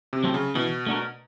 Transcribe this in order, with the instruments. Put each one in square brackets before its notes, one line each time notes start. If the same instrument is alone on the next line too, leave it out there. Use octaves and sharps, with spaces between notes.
[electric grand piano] C3
[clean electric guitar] F#3 A3 C4
[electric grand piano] C#3
[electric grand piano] B2 [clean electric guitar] E3
[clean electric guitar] A3 D4 F#4 A#4